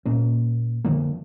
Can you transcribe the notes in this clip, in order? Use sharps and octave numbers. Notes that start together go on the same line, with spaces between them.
A#2 A#3 C#4
D3 D#3 F3 A#3